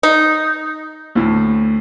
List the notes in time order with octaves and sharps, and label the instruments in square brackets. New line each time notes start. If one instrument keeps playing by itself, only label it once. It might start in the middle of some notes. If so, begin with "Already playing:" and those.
[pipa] D#4
[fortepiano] D2 A2